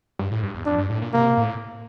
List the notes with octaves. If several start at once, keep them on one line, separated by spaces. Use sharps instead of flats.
G2
A2
G2
E2
F2 D4
G2
A2
A#2
C3 A#3
A2